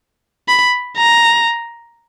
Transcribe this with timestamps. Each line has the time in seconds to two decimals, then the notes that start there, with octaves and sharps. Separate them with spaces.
0.48 B5
0.97 A#5